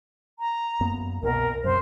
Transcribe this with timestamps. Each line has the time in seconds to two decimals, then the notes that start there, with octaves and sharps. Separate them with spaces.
0.39 A#5
0.80 F#2 A#3 B3
1.23 C2 B2 A#4
1.64 F#2 C3 C5